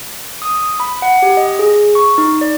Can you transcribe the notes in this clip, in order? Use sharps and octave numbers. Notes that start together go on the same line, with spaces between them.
D#6
B5
F#5
G4
D#5
G#4
C#6
D#4
D5